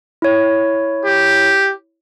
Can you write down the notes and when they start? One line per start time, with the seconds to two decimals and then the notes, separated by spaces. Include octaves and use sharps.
0.22 E4 C#5
1.05 G4